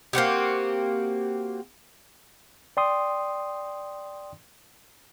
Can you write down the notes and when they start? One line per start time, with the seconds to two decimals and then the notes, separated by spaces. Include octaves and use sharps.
0.13 A#3 C4 F#4 G4
2.77 D5 G5 C6 D#6